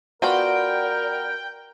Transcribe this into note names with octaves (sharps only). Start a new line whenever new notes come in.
B3 F4 F#4 A#4 D5 G5